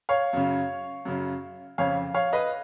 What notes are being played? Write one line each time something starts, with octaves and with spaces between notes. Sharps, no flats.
C#5 F5
F#2 C#3
F#2 C#3
F2 C#3 C#5 F5
C#5 F5
B4 D#5